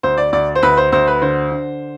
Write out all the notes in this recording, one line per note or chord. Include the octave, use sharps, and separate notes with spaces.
D2 C5
D5
D2 D5
C5
D2 B4
C5
D2 C5
B4
D3 C5
D3